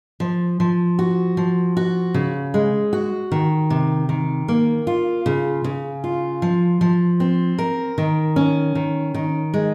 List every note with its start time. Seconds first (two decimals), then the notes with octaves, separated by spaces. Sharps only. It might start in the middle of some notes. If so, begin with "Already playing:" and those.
0.20 F3
0.60 F3
0.99 F#4
1.37 F3
1.77 F#4
2.14 C#3
2.54 G#3
2.93 F#4
3.32 D#3
3.70 C3
4.09 D#3
4.48 A#3
4.87 F4
5.26 C#3
5.64 C#3
6.04 F4
6.42 F3
6.81 F3
7.20 C4
7.58 A#4
7.98 D#3
8.36 C#4
8.75 D#3
9.14 D#3
9.54 G#3